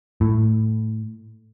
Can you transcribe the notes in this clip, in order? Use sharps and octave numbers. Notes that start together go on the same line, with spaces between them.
A2